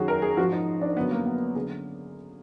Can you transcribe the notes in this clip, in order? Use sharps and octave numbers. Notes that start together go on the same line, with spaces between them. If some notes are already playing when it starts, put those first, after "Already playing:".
Already playing: F#2 D#3 F#3 F#4 G#4
A#4
G#4
G#2 F3 F#4
D#4
D4
F#2 D3 F#3 B3
A#3
B3
D3 F#3 G#4